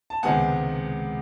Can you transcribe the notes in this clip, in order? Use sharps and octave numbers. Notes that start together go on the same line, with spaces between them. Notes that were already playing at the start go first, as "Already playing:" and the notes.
A5
C#2 C3 D#3 G#3 B3 F#5 G#5